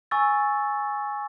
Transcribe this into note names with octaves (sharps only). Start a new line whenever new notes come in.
G#5 C#6 E6 A6